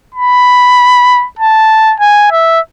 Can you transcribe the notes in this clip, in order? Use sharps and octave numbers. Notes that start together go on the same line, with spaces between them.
B5
A5
G#5
E5